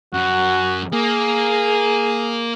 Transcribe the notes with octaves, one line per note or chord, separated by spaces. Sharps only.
F#2 F#4
A#3 G#4